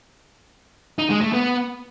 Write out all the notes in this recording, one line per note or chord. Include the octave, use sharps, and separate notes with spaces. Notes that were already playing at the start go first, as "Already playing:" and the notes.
D#4
G#3
A3
B3